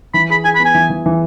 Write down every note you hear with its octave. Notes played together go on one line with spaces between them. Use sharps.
E3 B5
G#4 B5
G#4 G#5
B5
B3
G#5
E3
E3
E3